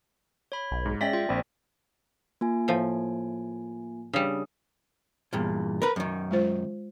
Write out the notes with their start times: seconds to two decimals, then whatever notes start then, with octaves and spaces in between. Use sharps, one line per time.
0.52 C#5 B5
0.71 B1
0.86 G#2
1.01 G#3 C#4 D5 E5 G5 A#6 B6
1.13 F4 G5
1.29 A#1 C4 D5
2.41 A#3 F4 G#5
2.68 A2 F3
4.13 C#3 G3 D4 D#6
5.33 E2 G2 A#2
5.82 A#4 B4
5.96 F#2 D#3
6.31 G#3 F4 C5